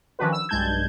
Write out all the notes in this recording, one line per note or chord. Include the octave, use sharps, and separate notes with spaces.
D#3 F3 C#4 D4 F#4 B4
E6
B1 G2 G#3 A5 G6 G#6